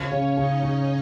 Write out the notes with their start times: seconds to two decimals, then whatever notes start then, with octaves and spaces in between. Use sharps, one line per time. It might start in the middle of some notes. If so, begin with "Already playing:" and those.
Already playing: C#3 C#4 C#5
0.12 C#3
0.38 C#3 D#4 D#5
0.63 C#3